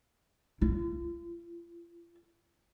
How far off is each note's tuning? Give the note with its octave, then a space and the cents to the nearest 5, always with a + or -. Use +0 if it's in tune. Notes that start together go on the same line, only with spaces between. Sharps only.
F4 -40